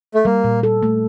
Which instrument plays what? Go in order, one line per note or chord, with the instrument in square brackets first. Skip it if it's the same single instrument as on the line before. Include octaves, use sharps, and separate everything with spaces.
[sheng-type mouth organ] A3
[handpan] G3 [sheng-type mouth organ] A#3
[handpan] A#2
A4
A3